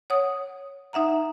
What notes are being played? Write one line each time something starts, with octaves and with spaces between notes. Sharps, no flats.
C#5 F#5 D#6
D#4 E5 F#5 A#5